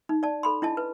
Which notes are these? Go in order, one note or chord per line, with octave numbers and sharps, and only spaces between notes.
D#4
D5 A5
A4 B5 C6
D4 E4 D#5 A5
B4